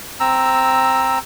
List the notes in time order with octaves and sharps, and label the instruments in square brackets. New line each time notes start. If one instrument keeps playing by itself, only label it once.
[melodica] C4 A#5 E6